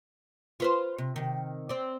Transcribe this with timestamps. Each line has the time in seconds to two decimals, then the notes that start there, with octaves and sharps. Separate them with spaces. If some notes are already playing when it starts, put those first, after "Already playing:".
0.60 F4 B4 C5
0.98 C3
1.16 C3 D#3
1.69 C4 D5